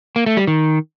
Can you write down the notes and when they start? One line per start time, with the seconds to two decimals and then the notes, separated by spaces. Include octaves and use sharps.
0.16 A#3
0.26 A3
0.37 G3
0.47 D#3